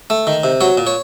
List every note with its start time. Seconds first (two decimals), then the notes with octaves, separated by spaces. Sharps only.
0.10 A3
0.27 D#3
0.44 C3
0.61 F#3 C#5
0.78 A#2
0.87 C#5